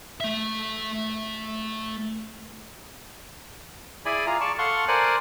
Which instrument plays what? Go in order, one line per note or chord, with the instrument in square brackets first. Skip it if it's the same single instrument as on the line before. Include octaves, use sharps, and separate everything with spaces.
[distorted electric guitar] A3 E5
[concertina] E4 G#4 D5 G#5 B5
F4 G#4 A#5
D5 A5 C#6
A4 F5 F#5 C6 C#6
A#4 C5 D5 G#5 F#6